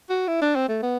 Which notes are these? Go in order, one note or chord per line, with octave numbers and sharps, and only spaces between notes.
F#4
E4
D4
C4
A3
B3